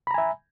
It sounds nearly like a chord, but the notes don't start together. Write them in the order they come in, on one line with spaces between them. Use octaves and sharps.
B5 A#5 G#5 E5